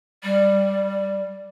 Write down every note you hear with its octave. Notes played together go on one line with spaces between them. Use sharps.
G3